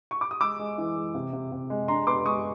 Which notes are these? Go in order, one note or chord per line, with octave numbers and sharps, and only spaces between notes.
C#6
D6
D#6
G#3 D6 E6
G#3
E3
G#3
C3
C3
C3
G#3
D4 A#5 C6
B3 C6 D6
G#3 C#6 D#6